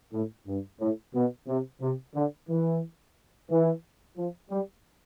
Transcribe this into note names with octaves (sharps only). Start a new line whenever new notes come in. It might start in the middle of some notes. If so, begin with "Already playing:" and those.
A2
G2
A2
B2
C3
C3
D3
E3
E3
F3
G3